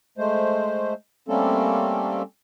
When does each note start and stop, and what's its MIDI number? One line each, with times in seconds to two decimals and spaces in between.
0.18 0.94 56
0.18 0.94 57
0.18 0.94 72
1.28 2.22 55
1.28 2.22 57
1.28 2.22 58
1.28 2.22 60
1.28 2.22 61
1.28 2.22 69